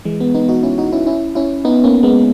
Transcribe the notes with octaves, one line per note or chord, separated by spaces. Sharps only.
E3 G#3
G#3 B3
B3 D#4
D#4 F#4
C#4 E4
D#4 F#4
C#4 E4
C#4 E4
C#4 E4
B3 D#4
A#3 C#4
G#3 B3